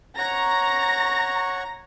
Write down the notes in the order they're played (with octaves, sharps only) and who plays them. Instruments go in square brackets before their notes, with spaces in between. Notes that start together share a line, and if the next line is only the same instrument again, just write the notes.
[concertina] C#5 F#5 C#6 [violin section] A#5 A#6